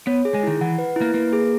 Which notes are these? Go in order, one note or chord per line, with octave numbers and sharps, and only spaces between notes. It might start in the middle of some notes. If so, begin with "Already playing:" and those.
B3 C#5
G#4
G#3
D#3 E4
E3 F#5
B4
E4
A#3
A#3 B4
G#4